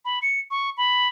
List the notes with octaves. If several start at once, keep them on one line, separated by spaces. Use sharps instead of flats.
B5
C#7
C#6
B5